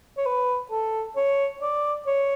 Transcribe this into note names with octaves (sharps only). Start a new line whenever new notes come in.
C#5
B4
A4
C#5
D5
C#5